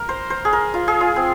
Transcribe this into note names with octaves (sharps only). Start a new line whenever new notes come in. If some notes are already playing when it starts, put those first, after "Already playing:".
Already playing: A#4
C5
C5
G#4
A#4
F4
G#4
F4
C4